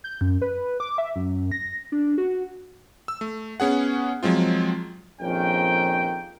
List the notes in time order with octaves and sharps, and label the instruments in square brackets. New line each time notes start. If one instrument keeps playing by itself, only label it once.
[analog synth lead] G6
F#2
B4
D6
E5
F#2
A#6
D4
F#4
[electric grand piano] E6
A3
B3 C#4 G#4 F#5
F3 F#3 G#3 C4 F4
[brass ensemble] A#1 F2 D#3 A#3 C#4 G5